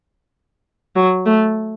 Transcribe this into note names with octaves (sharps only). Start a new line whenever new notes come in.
F#3
A3